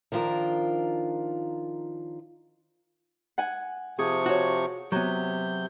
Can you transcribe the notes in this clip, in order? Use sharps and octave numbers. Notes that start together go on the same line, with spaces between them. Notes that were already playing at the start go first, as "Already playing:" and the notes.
D#3 F3 D4 F4 A#4
F#5 G#5
C3 F3 G#4 C#6
F#4 C#5
C3 F#3 B3 G6